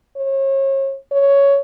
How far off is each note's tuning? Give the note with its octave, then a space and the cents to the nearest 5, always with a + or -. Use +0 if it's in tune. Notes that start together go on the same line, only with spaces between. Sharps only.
C#5 -35
C#5 +10